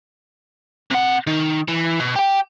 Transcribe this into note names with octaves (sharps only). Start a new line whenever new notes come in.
C3 F#5
D#3 D#4
E3
B2
G4 G5